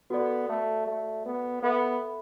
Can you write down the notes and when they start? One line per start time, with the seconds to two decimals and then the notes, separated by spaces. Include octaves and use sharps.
0.10 B3 F#4 A4 D5
0.49 A3
0.87 A3
1.26 B3
1.63 B3 A4 E5 B5